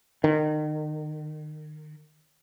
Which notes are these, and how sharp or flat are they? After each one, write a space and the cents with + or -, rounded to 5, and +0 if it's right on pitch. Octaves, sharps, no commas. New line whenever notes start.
D#3 -30